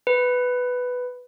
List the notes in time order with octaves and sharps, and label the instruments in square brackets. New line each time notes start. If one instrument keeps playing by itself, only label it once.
[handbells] B4